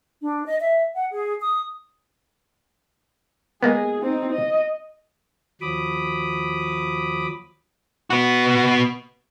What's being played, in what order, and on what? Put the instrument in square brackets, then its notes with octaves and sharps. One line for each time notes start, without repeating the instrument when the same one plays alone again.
[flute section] D4
D#5
E5
F#5
G#4
D#6
[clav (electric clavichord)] G#3 A#3 B3 [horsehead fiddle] G#4
[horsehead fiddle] C4 D#4
D#5
[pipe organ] D#2 F3 F#3 B5 D6 D#6
[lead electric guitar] B3 F#4